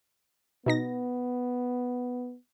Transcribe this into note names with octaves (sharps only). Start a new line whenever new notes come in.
B2 B3 D#4 A#6